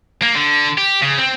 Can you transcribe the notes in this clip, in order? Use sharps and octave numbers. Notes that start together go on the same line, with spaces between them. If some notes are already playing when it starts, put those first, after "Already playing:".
A#3
D3
G4
C#3
C4